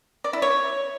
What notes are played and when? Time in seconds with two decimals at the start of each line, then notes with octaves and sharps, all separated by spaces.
0.24 D5
0.33 E4
0.42 C#5